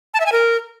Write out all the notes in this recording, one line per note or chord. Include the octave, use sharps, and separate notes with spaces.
A5
E5
G#5
A#4